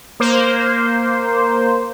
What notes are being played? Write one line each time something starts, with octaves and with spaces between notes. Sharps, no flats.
A#3 C5